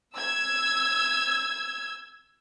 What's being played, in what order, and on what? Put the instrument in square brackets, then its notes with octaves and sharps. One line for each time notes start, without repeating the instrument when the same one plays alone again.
[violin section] E6 G#6